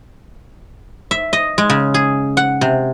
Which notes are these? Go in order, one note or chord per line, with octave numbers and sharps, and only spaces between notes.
E5
D#5
G#3
C#3
G#4
F#5
C3